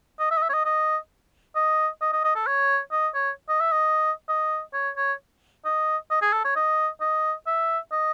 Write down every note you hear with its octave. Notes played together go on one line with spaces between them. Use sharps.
D#5
E5
D#5
E5
C#5
D#5
D#5
D#5
D#5
D#5
D#5
A4
C#5
D#5
C#5
D#5
E5
D#5
D#5
C#5
C#5
D#5
D#5
G#4
A4
C#5
D#5
D#5
E5
D#5